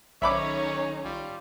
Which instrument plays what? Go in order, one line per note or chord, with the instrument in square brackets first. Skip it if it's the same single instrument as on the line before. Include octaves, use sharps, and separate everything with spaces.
[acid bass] B1 [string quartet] D#3 C#4 D#4 [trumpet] C#5 [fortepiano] E5 B5 D6
[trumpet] G3 [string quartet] F4